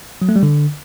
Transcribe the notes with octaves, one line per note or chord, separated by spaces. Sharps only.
F#3
A3
G3
D3